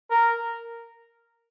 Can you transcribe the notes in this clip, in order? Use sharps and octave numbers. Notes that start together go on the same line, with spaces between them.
A#4